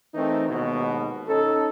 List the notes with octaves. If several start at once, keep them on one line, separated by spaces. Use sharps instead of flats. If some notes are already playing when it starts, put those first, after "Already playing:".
E3 A3 C4 D#4 A#4
D#2 G#2 B2
C#4 D#4 A4